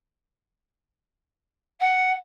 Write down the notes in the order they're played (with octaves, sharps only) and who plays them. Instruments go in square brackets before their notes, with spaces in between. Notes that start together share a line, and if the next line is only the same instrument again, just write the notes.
[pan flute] F#5